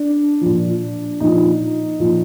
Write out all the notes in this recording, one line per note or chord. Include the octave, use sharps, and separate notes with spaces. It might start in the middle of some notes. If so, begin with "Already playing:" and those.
Already playing: D4
A#2 F3
A#2 F3 D#4
A#2 F3